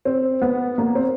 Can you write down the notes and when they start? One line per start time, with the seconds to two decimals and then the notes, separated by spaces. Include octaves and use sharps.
0.05 C4
0.42 B3
0.78 A#3
0.95 C4